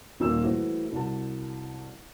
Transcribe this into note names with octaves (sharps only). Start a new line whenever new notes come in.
D#1 A#2 D#3 A#3 E6
E3 A3 F#4 C5
C2 F#4 A5